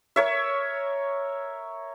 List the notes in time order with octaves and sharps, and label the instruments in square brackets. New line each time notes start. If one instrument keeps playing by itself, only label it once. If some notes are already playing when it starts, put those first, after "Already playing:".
[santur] A#4 C#5 E5